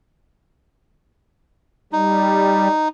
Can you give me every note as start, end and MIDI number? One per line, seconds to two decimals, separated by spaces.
1.93 2.68 55
1.93 2.88 63